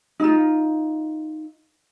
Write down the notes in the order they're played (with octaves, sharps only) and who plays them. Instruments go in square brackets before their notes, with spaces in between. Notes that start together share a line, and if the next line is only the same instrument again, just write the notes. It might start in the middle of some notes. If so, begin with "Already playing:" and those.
[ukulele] D#4 F4